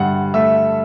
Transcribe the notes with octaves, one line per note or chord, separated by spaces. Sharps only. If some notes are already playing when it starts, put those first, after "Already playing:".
Already playing: G2 D3 F#5
A3 E5